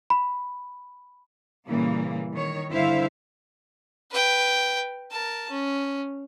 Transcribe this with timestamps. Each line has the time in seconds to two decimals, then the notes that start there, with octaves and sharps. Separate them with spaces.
0.10 B5
1.67 A#2 C#3 E3 G3 A#3
2.34 D#3 C#5
2.69 G2 D3 E4 C5 E5 F5
4.11 B4 G5
5.11 A#4 A5
5.50 C#4